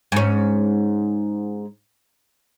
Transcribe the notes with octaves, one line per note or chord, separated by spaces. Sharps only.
G#2 C#4